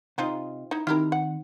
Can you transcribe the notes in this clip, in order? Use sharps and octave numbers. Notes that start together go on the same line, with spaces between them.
C3 C4 D#4 F4 D#5
D#4 E4
D#3 C4 D#4 E4 G4 A#4 F6
F#5